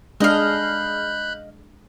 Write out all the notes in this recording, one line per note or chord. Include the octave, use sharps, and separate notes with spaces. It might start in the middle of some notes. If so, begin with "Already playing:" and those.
G#3 D4 G#4 D#5 F5 B5 F#6 G6